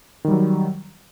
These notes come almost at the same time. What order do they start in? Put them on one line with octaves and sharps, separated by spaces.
D#3 G3 F#3